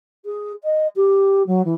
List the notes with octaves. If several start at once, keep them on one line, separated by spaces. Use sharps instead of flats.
G#4
D#5
G4
F#3
E3